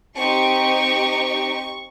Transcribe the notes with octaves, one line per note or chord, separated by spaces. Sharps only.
C4 D#4 G4 C#6